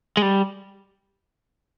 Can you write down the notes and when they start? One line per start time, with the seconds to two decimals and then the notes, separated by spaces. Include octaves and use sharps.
0.17 G#3
0.22 G3